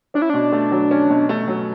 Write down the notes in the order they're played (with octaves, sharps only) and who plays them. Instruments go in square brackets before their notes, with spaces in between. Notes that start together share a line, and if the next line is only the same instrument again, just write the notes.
[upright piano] C#4 [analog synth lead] D4
[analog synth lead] E4
[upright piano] B2 [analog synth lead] D4
[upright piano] A3
F#3
C#4
B2
A3
F#3